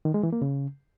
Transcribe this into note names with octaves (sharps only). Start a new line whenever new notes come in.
D#3
G#3
E3
A#3
C#3